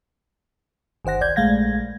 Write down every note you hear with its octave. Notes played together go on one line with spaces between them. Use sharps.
G1 D#3 C5 F#5 A#6
C#2 D5 G6 G#6
A#1 G#3 A3 F5 G#6 A#6